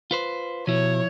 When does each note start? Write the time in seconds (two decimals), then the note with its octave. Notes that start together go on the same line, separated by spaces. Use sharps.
0.11 F4 B4 C5
0.67 B2 F3 E4 C#5